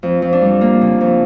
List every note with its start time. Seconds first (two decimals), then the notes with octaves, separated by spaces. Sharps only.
0.03 F2
0.22 F2
0.33 D4
0.41 G3
0.61 A#3
0.81 C#3
1.01 F2